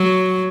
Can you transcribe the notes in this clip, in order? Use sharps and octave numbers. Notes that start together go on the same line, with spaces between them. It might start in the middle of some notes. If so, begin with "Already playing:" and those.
Already playing: F#3